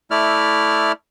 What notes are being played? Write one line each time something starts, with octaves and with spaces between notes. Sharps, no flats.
A3 E4 D5 F6